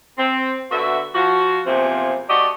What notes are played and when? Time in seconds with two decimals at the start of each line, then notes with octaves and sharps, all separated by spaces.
0.18 C4
0.71 D3 B3 F#4 E5
1.15 F3 F#4
1.66 E2 C3 F3 A#3 C4
2.29 A3 F#4 G4 D5 D#5